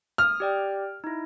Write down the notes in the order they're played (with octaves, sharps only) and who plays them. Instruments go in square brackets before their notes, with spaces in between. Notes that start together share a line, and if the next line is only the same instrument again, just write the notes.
[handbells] D#6 [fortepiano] F6
[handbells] G4 D5 G5
D#4 E4